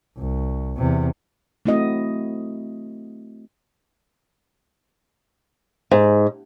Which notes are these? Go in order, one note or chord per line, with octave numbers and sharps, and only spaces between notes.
C2
E2 C3
A3 C4 E4 F#4 D#5
G#2